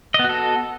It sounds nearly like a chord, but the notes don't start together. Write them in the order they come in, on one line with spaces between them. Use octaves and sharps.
D#5 B3 F#4 A4